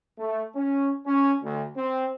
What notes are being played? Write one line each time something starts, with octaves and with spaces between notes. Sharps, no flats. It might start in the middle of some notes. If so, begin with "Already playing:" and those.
A3
C#4
C#4
D2
C4